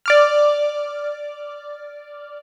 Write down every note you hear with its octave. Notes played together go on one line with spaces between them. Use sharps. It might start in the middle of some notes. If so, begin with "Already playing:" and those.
D5 D6 F6